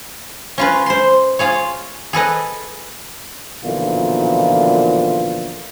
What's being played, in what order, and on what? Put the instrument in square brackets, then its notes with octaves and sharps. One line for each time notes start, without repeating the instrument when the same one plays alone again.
[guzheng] C#4 F4 B4
C5 C6
F4 G#4 C#5
G#4 A4 B4 D#5
[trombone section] B1 A#2 D3 E3 F3 F4